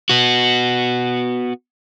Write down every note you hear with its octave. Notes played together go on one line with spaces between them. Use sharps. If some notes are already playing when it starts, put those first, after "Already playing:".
B3 F#4